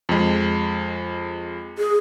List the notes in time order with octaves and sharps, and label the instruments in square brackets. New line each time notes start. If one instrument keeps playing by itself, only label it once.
[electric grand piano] F2 G#3
[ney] G#4